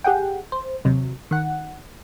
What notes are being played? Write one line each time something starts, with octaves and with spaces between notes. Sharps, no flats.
G4 G#4 F#5 G5
C5
D#2 C3 F#3
D#3 F#5